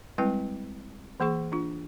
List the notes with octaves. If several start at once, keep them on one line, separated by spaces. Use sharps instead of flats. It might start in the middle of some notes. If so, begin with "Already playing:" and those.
G3 G#3 C4 E4 B4 G5
E3 A#3 G#4 C#6
D4 F4